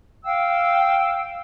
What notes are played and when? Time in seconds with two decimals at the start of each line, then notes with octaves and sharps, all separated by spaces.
0.23 F5 G5 E6